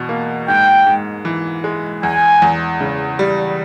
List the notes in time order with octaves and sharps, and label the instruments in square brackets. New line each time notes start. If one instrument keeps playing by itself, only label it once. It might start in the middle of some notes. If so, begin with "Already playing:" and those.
Already playing: [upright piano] E2 B2
A#3
[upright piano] G#2 [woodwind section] G5
[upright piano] G#2
E3
G#3
[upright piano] E2 [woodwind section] G#5
[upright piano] E2
C#3
G3